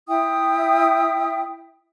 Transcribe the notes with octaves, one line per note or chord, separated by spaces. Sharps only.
E4 E5 G5 D#6